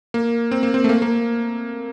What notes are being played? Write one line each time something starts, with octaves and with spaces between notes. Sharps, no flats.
A#3
C4
A#3
C4
A3
A#3
A#3